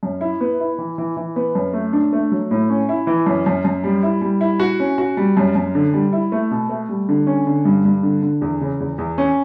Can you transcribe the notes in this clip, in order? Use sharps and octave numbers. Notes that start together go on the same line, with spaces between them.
F#2
E4
B3
E4
E3
E3
E3
B3
F#2
A3
D4
A3
F#3
A2
C#4
E4
E3
F#2
F#2
F#2
G3
E4
G3
E4
F#4
C#4
F#4
G3
F#2
F#2
D3
G3
E4
A3
B2
A3
G3
D3
C#4
D3
G2
G2
D3
D3
E2
C#3
E2
E2
C#4